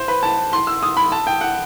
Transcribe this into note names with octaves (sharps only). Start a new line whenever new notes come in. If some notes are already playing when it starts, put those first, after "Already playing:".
Already playing: C5
B4
A5
C6
E6
D#6
B5
A5
G5
F#5